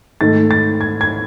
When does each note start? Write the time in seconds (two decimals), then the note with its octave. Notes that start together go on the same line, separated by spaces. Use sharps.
0.21 G#2 D#3 A3 A6
0.51 A6
0.81 G#6
1.01 G#6